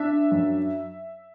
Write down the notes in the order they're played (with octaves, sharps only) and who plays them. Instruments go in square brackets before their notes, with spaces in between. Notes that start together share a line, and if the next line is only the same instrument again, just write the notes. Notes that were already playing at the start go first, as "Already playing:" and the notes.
Already playing: [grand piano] D4 [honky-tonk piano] E5
[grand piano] F#2